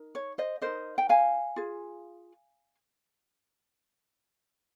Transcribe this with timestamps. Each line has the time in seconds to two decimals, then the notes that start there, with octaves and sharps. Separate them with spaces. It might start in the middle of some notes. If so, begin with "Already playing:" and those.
Already playing: D#4 A#4
0.15 C#5
0.38 C5 D#5
0.62 D#4 A#4 C5 D#5
0.98 G5
1.09 F5 G#5
1.56 F4 G#4